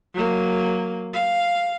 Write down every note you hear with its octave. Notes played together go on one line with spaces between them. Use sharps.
F#3 A#3
F5